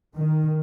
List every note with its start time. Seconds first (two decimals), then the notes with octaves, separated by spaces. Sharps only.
0.16 D#3